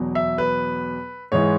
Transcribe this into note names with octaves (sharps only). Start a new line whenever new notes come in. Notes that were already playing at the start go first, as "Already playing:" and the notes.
Already playing: E2 B2 F#3
E5
B4
G#2 E3 G#3 C#5